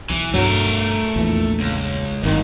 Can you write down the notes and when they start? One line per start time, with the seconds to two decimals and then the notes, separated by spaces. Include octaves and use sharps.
0.10 B1 E3
0.34 B1 G2 F#3 A3 A#4
1.16 A#1 E2 E3
1.60 C#2
2.23 G1 F2 G#2 D#3